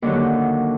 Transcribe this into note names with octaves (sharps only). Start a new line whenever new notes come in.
D#2 D3 F#3